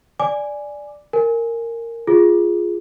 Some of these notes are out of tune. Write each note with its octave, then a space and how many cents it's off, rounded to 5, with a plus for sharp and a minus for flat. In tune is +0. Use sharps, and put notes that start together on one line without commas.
D5 +0 G#5 +0 D6 +0
A#4 -15 G#5 +0
F4 +0 G#4 +0 D6 +0